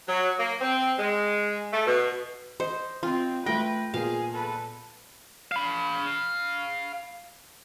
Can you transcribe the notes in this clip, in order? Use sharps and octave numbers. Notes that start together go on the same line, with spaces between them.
F#3
A#3
C4
G#3
A3
B2
C5 D#5
C4 F4
A3 B4 G5 A#6
A#2 B3 G#4 F5
A4 B4
F5 B5